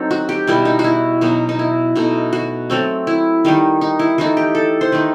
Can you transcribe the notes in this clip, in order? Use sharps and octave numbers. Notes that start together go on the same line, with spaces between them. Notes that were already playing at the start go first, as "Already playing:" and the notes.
Already playing: F#3 C4 D#4 A4
F#4
G4
B2 G3 B3 E4
D#4
F#4
E4
B2 F#3 B3 D#4
D#4
E4
B2 A3 D#4
F#4
F#3 A3 C4
E4
D#3 G3 D#4
D#4
E4
E3 A3 D#4 F#4
G4
A4
C5
D#3 A3 D#4 B4